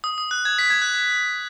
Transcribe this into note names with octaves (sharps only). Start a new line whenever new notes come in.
D#6
D#6
F#6
G#6
B6
G#6
F#6
G#6